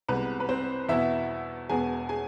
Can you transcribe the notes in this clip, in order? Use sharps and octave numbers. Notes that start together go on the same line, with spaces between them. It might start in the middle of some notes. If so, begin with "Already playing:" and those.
C2 C3 G#3 B3 B4
B4
C4 C5
E2 B2 B3 E4 E5
E1 E2 B2 B3 G#4 G#5
G#4 G#5